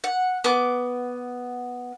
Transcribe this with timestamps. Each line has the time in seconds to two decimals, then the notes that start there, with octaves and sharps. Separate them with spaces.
0.04 F#5
0.44 B3 D6